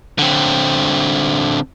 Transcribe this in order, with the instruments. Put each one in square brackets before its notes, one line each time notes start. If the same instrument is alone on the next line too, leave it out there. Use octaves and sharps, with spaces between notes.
[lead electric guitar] D3 C4